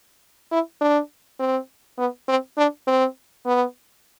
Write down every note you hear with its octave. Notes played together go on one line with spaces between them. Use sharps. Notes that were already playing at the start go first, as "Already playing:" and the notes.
E4
D4
C4
B3
C4
D4
C4
B3